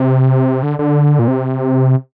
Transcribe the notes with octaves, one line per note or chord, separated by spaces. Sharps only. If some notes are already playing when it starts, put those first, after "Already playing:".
Already playing: C3
D3
D3
A#2
C3